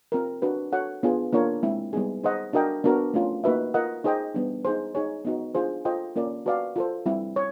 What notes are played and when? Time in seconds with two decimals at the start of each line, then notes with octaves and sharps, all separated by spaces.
0.12 C4 F4 A#4
0.42 D4 F#4 B4
0.73 F#4 A4 C#5 F#5
1.03 B3 D4 F4 G#4
1.33 A#3 D4 F4 A#4 C#5
1.63 G#3 C4 E4
1.93 G3 B3 D#4 G#4
2.24 D#4 G#4 C5 D#5 F#5
2.53 D4 F#4 A#4 D#5 G5
2.84 B3 D4 F#4 A#4
3.14 A3 C#4 F4
3.44 A#3 D#4 F#4 B4 E5
3.74 F4 A#4 D#5 F#5
4.04 D#4 G#4 C5 D#5 G5
4.34 G3 B3 D4
4.65 D#4 G#4 C5
4.95 D#4 G#4 C#5
5.25 B3 D#4 F#4
5.55 D4 F4 G#4 C5
5.85 F4 A4 C5 D#5 G5
6.16 A#3 C#4 F4 A#4 D5
6.46 F#4 B4 D5 F5
6.76 F4 A4 C5
7.06 G3 C4 E4
7.36 C#5